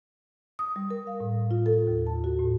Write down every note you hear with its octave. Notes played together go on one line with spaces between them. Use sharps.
D#6
G3
A#4
F5
A2
F4
A4
D#2
A5
F#4
A2